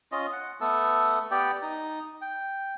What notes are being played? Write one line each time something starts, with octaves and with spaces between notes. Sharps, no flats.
C#4 F4 D#5
F#5
A3 B3 A4
B3 G4 D5 G5
D#4
G5